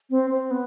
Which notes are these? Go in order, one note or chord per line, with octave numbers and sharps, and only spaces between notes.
C4
C4
B3